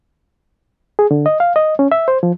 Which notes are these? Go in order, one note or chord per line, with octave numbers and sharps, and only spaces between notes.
G#4
D3
D#5
F5
D#5
C#4
E5
C5
F3